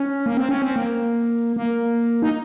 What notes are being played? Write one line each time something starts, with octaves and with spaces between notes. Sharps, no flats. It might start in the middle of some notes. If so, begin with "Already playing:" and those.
Already playing: C#4
A#3
C4
C#4
C4
A#3
A#3
D#4